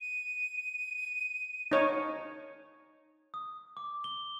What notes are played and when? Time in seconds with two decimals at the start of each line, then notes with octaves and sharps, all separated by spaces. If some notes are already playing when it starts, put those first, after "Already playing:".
0.01 D#7
1.72 D#4 C#5
3.34 D#6
3.77 D6
4.04 G7